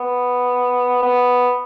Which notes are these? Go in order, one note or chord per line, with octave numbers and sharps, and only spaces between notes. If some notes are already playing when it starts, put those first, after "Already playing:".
Already playing: B3
B3